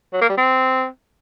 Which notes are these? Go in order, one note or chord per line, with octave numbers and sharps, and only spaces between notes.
F#3
A#3
G3
C4